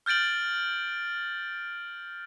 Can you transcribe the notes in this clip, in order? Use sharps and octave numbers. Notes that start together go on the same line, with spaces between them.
F6 G6 A6 D7 F#7